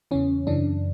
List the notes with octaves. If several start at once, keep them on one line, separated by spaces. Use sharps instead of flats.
E2 C#3 E3 C#4
F#2 C#3 E3 D4